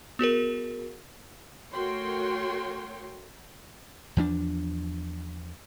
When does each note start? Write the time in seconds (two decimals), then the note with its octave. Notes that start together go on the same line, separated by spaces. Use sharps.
0.19 B3 F#4 G#4 A#4
1.74 A3 F#4 A#4 C#5 G5 C6
4.17 E2 F3 A3 D4